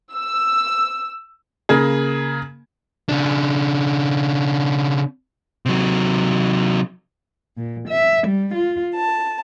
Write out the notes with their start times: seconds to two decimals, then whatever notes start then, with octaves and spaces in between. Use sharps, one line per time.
0.15 E6
1.69 C#3 A#3 G#4
3.09 C#3 D4
5.66 C3 F#3
7.57 A#2
7.89 E5
8.27 G3
8.55 F4
8.95 A5